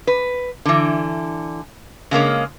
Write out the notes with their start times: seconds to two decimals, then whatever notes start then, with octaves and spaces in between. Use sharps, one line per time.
0.07 B4
0.65 D3 E3
2.11 C#3 G#3 A#3 C#4